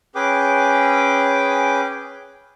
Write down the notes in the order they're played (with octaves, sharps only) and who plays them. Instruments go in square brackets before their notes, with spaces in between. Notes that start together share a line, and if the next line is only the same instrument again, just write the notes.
[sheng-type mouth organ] C#4 G#4 B4 G5 D6